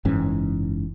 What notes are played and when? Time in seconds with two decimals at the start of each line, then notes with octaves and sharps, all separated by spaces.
0.05 F#1 G#2 E3 C#4